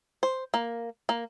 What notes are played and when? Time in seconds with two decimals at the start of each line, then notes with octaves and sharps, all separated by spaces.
0.23 C5
0.54 A#3
1.09 A#3